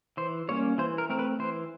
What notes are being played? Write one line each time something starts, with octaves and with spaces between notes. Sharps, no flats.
E3 C5
G3 A#3 C#4 C#5
E3 C5
A#4
A3 C4 A#4
B4
E3 C5